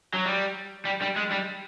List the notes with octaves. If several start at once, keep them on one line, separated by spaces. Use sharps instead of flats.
F#3
G3
G3
G3
G#3
G3